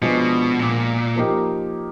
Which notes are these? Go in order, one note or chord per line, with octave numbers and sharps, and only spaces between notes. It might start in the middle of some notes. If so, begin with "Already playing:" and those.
B2 F3 G#3 B3 D4
A#2
F3 A#3 D#4 G4